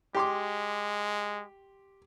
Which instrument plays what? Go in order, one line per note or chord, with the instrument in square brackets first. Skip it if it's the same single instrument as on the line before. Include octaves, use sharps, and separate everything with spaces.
[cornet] G#3 [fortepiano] G4 C6 D6